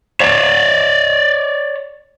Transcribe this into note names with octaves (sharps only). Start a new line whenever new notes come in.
C#5 D5